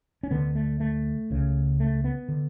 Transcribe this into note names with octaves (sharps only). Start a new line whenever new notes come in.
C#4
D2 D3 B3
A3
A3
C#2 C#3
A3
B3
D3